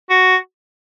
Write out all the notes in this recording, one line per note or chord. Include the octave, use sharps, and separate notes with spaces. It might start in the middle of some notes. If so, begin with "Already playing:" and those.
F#4